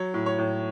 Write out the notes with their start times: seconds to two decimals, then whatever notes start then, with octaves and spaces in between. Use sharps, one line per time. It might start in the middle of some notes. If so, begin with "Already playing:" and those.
Already playing: F#3 C#5
0.14 A2
0.26 C#5
0.38 A2